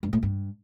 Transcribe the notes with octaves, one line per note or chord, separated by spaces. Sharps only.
G2
A2
G2